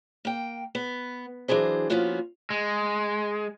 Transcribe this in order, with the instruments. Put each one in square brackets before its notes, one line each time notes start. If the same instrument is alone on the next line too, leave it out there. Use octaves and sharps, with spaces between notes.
[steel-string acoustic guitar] A#3 G5
B3
E3 F#3 D4 G#4 C5
F3 A#3 B3 C#4 F4 F#4
[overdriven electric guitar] G#3